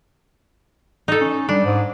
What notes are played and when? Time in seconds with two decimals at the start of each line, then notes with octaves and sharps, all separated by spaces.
1.08 D#4 A4
1.21 C#4
1.49 G3 D4
1.64 G#2